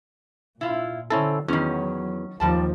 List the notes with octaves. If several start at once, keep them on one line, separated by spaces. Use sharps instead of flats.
A#2 E4 F4
D3 C4 C#4 E4 A4
E2 D#3 F#3 C#4
D#2 A#2 F3 G3 A5